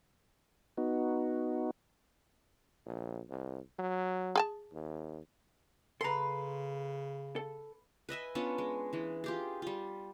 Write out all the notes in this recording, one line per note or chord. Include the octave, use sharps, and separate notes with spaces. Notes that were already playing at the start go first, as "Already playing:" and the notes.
B3 D#4 F#4
A#1
C2
F#3
G#4 G#5 A5
D#2
C#3 A4 B4 A#5 C6
A4
B4 D#5 E5 G#5
B3 C#4 D4 F4
G#3
E3 G#3
F4 G4 G#4
G3 F4